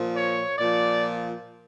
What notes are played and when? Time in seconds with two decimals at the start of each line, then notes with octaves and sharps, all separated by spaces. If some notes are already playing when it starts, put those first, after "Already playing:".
Already playing: A#2 F3
0.14 C#5
0.59 A#2 F3 D5